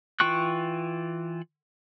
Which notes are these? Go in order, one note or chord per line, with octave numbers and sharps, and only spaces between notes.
E3 F4 G5 C#6 F#6